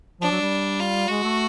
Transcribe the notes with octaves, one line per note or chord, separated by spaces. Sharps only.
F3 D4
F#3
G3
F4
G#3 F#4
A3